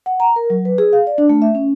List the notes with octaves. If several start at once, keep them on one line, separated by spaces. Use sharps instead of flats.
F#5
A#5
A#4
F#3
B4
G#4
F5
D5
D4
A3
E5
C#4